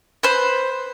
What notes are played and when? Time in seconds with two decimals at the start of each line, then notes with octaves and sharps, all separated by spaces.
0.23 B4 C5